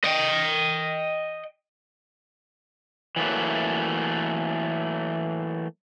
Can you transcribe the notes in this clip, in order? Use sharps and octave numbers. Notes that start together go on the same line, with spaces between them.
D#5 G5
E3 F#3 A3 A#3